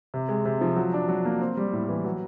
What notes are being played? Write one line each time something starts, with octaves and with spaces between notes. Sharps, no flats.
C3
G#3
C3
F3
F#3
D4
F#3
A#3
C4
G3
A2
E3
F#3